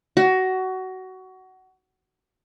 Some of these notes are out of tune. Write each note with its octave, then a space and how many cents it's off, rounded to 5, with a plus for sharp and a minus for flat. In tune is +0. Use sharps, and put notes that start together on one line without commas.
F#4 +20